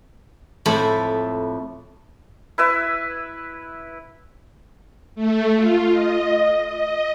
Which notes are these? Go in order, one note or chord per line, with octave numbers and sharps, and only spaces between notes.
F2 A2 A3 C5 G#5 B5
E4 B4 E5
A3
F4
D#5
D#5